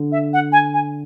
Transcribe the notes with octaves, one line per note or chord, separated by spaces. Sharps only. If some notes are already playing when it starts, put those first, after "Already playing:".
Already playing: D3
E5
F#5
G#5
G#5